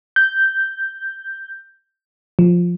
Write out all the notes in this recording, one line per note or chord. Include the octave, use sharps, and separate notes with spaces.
G6
F3